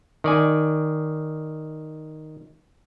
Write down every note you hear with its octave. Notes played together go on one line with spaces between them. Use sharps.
D#3 D5 G#5